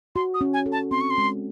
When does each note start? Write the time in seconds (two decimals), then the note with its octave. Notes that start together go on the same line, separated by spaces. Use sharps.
0.15 F#4 C6
0.34 D#6
0.41 C#4
0.53 G#5
0.66 A4
0.72 A5
0.91 C4 C6
1.01 C#6
1.10 C6
1.18 G#3